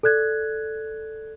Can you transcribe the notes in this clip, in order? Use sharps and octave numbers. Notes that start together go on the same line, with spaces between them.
A4 D5 F#6 G#6